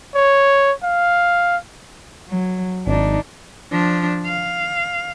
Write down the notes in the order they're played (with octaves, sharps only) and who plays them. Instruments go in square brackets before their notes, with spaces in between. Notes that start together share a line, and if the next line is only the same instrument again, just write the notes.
[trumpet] C#5
F5
[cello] F#3
[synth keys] G#1 [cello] D4 D#4
[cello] F3 D4
F5